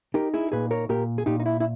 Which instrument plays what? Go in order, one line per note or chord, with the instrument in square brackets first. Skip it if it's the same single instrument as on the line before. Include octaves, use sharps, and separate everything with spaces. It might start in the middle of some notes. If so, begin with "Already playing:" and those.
[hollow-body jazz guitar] D#4 G4 A#4
E4 G#4
A#2 G#4 B4
A#4 C#5
A#2 G4 A#4
G#4
A#2 D#4 G4
D#4
E4
E4